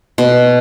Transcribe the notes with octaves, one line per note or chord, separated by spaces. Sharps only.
B2